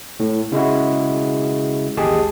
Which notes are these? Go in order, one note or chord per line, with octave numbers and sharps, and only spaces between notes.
A2
C#3 G#3 E4 F#4
A1 D#2 G#3 G4 G#4 A5